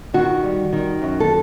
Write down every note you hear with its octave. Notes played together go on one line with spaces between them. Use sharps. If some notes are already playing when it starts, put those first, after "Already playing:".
D#3 F#4
G3
D#3
F#2
A4